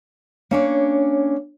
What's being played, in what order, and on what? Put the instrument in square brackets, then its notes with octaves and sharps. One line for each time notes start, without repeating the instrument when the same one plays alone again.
[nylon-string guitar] A#3 C#4 D4 [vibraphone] C#5